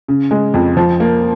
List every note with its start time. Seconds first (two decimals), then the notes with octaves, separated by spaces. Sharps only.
0.08 C#3
0.31 G#3
0.54 F2
0.77 F3
1.00 A#3